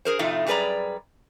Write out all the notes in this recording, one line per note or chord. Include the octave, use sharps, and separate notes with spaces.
G#4 A#4 C5
F2 A2 C3 A3 D#4 F4
F#2 G3 G#4 B4 D5 A#5